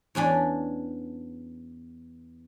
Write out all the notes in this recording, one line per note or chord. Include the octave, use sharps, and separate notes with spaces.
E2 C#4 D4 B5